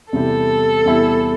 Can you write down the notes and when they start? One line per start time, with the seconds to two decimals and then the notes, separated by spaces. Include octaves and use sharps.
0.13 E2 C3 G3 E4 G4 A4
0.86 E2 C3 G3 E4 G4